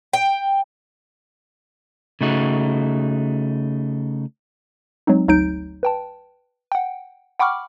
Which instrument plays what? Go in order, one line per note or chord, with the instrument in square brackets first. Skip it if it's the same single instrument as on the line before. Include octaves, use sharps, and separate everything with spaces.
[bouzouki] G5
[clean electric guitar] C#3 A3 D#4 F#4
[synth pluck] F#3 G#3 C4 D#4
G1 D2 F#3 D#4 G6 D7
B4 G5 A5
F#5 G5
F#5 G5 B5 C#6 D6 F6